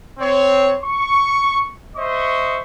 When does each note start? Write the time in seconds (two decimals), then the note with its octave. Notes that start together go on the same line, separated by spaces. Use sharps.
0.19 C4 C#5
0.82 C#6
1.96 C5 D#5 E5 C#6